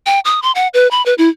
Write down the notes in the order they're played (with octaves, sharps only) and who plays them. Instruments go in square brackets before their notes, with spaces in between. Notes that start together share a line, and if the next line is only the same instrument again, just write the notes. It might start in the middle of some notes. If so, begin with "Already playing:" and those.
[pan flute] G5
D#6
C6
F#5
B4
B5
B4
E4